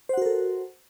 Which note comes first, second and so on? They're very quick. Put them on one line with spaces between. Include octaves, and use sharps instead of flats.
C5 F#5 F#4 A#4 A4